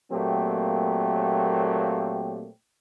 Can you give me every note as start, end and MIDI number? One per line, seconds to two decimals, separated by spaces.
0.12 2.48 46
0.12 2.48 54
0.12 2.48 57
0.12 2.48 58
0.12 2.48 60
0.12 2.48 67